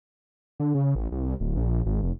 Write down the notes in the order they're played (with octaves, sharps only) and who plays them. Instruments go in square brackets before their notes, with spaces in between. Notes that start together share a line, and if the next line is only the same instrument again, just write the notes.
[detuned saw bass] D3
C#3
A1
C2
D1
A#1
G#1
F1